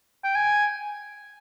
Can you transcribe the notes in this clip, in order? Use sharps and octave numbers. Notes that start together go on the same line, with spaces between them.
G5
G#5